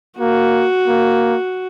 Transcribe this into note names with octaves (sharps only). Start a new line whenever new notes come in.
A#3 F#4
A#3